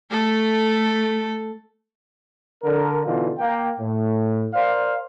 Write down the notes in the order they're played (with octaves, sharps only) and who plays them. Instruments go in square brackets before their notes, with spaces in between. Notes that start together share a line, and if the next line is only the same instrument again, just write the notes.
[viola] A3 A4
[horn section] D3 A#4
B2 D3 E3 D#4 F4
A#3 G5
A2
A#4 C5 D5 F5